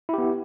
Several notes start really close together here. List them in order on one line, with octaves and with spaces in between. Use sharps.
E4 G4 B3